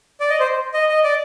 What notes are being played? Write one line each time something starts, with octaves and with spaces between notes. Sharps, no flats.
D5
D#5
C5
D#5
D#5
D5